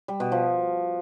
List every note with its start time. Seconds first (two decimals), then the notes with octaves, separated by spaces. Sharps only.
0.08 G3
0.20 B2
0.32 F3